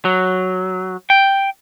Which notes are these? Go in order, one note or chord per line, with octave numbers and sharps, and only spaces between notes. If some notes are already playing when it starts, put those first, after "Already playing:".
F#3
G5